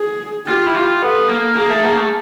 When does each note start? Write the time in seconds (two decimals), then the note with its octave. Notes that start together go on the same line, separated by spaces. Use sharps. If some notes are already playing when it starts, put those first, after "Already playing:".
Already playing: G#4
0.47 F4 G4
0.66 E4
0.75 F4
1.02 B3 A4
1.29 A#3
1.56 A#3 G#4
1.69 A3
1.84 A#3
1.97 A3